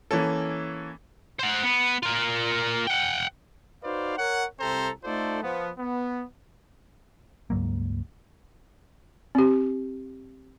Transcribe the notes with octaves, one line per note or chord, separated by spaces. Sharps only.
E3 A#3 C#4 A4
C5 F#5
B3
F4 A#4
F#5 G5
D#4 F#4 B4 C5 D5 F5
A#4 C#5 F#5
C2 C3 C4 A4 C5 A#5
A3 D#4 F4 A4 C5 D5
F3 B3
B3
C#2 G2 F#3 A#3
C4 G4